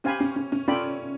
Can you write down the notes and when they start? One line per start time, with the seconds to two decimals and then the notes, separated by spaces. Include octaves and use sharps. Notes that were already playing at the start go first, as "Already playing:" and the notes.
0.04 C#4 G4 C5 F5 G#5 B5
0.20 C#4
0.36 C#4
0.52 C#4
0.68 C#4 F4 A4 D5 G5 B5